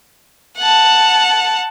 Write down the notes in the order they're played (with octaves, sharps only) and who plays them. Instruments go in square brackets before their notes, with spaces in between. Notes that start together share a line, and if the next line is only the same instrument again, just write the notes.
[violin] F#5 A5